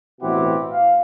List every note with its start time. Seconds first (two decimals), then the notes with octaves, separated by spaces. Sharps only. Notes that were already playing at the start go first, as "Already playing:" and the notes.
0.21 A1 B2 C4 E4 G4 F#5
0.72 F5